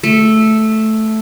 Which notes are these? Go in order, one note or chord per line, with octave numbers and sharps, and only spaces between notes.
A3